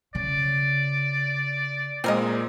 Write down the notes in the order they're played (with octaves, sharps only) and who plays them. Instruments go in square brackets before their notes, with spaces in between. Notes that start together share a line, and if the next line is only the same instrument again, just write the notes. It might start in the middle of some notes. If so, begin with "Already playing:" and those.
[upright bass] C#3 [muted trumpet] D5
[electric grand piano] A#2 G#3 [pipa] C4 A#4 D#5